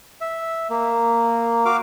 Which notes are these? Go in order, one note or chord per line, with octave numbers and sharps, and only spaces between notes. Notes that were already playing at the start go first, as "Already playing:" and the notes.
E5
A#3
F#4 F5 D6